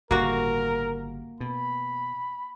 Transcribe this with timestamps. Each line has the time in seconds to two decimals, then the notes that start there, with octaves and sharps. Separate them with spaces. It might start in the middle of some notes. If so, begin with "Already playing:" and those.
0.11 G1 A2 C#3 A#3 F#4 A#4
1.40 B2 B5